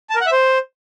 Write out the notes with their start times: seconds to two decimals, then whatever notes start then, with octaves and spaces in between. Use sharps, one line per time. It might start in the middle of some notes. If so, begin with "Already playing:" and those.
0.10 A5
0.15 A#4
0.21 F#5
0.26 E5
0.32 C5